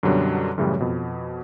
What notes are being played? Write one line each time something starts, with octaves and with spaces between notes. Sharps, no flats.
F#2 B2 D3 F#3 G3 D4
F#2 A2 C#3 E3 G3
F2 B2